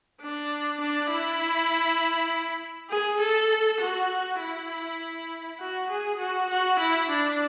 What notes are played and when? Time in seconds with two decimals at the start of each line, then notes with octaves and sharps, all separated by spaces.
0.21 D4
0.81 D4
1.11 E4
2.90 G#4
3.20 A4
3.81 F#4
4.40 E4
5.60 F#4
5.90 G#4
6.19 F#4
6.50 F#4
6.79 E4
7.10 D4